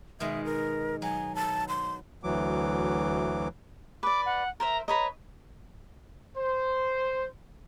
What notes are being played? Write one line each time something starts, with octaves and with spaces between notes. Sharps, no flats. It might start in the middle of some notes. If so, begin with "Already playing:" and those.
B2 D#3 G#3 E5
A#4
F#3 G#5
A5
C6
D2 E3 F#3 D6
B4 D5 D6
F#5
A#4 C5 E5 A#5
B4 C#5 D#5 A#5
C5